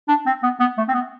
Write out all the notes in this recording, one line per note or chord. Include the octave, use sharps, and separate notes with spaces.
D4
C4
B3
B3
A3
C4
B3